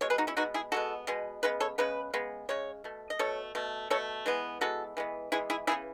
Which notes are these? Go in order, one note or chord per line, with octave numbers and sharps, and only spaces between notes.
B2 G#3 C#5
G#4 B4
D#4 F#4
C#4 E4
B2 G#3 B3 D#4 F#4
E4 G#4
B2 G#3 B3 F#4 A4
B2 G#3 B3
C#3 G#3 B3 B4
A4 C#5
C#3 G#3 B3 B4
C#3 G#3 B3
C#3 G#3 C#5
B2 A3
D#5
B2 A3 A4 C#5
B2 A3
B2 A3 A4 C#5
E3 G#3 B3
E3 G#3 B3 F#4 A4
E3 G#3 B3
E3 G#3 B3 E4 G#4
E4 G#4
C#3 E3 B3 E4 G#4